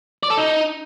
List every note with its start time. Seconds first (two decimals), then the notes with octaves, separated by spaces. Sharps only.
0.23 D5
0.30 A4
0.37 D#4